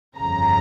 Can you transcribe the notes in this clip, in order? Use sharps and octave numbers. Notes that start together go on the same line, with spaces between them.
G1 F2 C#3 A#5